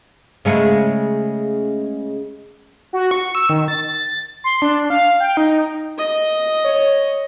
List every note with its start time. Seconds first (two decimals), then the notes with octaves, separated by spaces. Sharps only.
0.45 C#3 G#3 A3
2.93 F#4
3.11 C#6
3.35 E6
3.49 D#3
3.68 A6
4.44 C6
4.62 D4
4.90 F5
5.20 G5
5.37 D#4
5.98 D#5
6.65 C#5